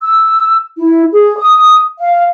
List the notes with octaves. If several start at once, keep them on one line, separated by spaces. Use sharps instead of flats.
E6
E4
G#4
D#6
F5